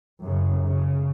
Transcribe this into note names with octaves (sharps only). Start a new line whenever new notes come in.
F#2 C#3
C#3